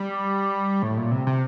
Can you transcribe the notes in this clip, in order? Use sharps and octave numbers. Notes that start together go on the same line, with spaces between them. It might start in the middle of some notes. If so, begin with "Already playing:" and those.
Already playing: G3
A2
A#2
C3
C3